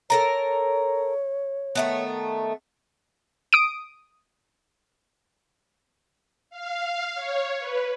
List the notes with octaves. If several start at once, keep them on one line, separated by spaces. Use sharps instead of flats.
A4 A#4 C#5 A#5
D#3 A3 B3
D#6 D7
F5
F5
C#5
B4